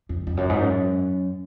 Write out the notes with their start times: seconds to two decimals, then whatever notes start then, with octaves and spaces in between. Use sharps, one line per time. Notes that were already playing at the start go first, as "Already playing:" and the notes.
0.09 F2
0.27 F2
0.37 F#2
0.49 G#2
0.61 F#2